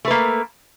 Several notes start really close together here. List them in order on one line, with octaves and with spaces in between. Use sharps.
A3 B4 A#3